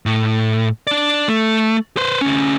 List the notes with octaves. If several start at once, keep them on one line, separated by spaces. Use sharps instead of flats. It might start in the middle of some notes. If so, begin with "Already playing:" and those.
A2
D4 D5
A3
B4 C5
D2 C#4